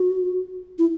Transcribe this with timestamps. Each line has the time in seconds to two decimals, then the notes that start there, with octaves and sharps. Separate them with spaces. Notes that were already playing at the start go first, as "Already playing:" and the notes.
Already playing: F#4
0.79 E4